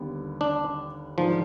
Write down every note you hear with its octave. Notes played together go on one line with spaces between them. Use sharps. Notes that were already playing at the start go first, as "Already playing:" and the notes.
Already playing: D#2 D3 G3 B3
D4
G#2 D#3 F3 G#3 D4 F4